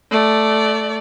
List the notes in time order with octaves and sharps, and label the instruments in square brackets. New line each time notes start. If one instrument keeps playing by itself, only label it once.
[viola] A3 D5